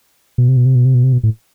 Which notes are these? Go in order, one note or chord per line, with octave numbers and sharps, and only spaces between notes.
B2
C3
B2
C3
B2
C3
B2
C3
B2
A2